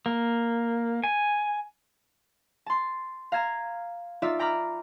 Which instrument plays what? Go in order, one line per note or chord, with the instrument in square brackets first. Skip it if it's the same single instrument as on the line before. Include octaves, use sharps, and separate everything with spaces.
[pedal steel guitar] A#3
G#5
[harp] A5 C6
F5 A#5 G#6 E7
D#4 F4 D5 E5
G5 A#5 B5 D6 F6